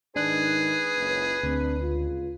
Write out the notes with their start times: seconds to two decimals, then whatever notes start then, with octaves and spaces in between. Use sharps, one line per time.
0.16 G#2 D#3 D4 D#4 G#4 B4 F#6
0.96 F#1 C#2
1.43 D2 C4 D4
1.81 C#2 F4